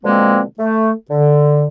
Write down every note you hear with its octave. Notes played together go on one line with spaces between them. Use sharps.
B2 D3 F3 G#3 A#3 C4
A3
D3